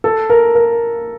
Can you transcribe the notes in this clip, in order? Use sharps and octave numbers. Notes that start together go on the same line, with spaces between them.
A4
A#4
A#4